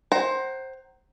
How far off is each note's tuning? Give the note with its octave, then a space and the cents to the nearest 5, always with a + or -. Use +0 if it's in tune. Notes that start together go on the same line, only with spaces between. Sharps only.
C5 +15 F#5 +45 A#5 +0